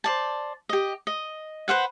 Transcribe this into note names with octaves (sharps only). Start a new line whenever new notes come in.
C5 D5 A5
G4 D#5
D#5
B4 C5 F5 F#5